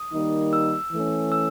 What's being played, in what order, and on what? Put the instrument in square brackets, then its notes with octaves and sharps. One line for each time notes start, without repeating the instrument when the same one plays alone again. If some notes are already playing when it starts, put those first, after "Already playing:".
Already playing: [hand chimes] D#6
[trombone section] D#3 G3 A#3 D#4
[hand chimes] E6
[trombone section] E3 A3 C#4
[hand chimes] E6